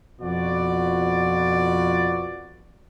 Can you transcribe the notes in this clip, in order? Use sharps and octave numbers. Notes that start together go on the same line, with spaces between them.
F2 B2 F4 F#4 B4 D5